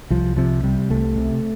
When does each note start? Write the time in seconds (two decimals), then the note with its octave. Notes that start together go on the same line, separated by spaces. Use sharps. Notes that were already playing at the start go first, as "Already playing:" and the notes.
0.10 C2 F3
0.37 C3 F3
0.63 C3 G3
0.90 C2 A3
1.17 C3